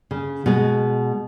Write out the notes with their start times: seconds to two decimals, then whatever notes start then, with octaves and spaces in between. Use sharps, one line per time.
0.11 C#3
0.46 B2 G#3